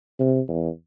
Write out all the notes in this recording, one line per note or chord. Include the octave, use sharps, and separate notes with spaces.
C3
E2